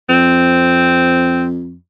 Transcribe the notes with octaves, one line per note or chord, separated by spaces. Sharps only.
F2 C4